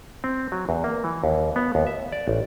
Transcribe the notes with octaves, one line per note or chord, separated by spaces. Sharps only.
C4
F#3
E2
A#3
E3
D#2
B3
D#2
E5
D5
A1